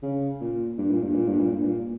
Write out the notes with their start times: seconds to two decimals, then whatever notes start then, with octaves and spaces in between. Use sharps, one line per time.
0.03 C#3
0.41 A#2
0.78 G2
0.91 A#2
1.03 G2
1.15 A#2
1.28 G2
1.40 A#2
1.53 G2
1.65 A#2